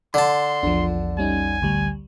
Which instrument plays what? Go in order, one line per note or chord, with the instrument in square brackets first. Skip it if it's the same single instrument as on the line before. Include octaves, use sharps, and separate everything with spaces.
[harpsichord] D3 A5 [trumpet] C6
[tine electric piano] A#1 E2 [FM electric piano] F3 D4
[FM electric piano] G3 C#4 D#4 [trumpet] G#5
[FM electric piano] A1 D2 G3